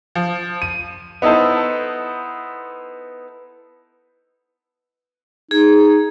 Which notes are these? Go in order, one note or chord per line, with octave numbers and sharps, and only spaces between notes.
F3
D#7
B3 D#4 E4 A4 C5
D#4 G#4